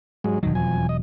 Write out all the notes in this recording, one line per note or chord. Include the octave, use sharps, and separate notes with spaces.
G#2 F#3 G#3
E1 D#3 F#3
F2 G#5
D#5